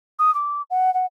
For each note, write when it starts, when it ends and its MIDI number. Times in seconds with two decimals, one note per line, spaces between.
0.19 0.33 87
0.35 0.62 86
0.70 0.93 78
0.94 1.06 78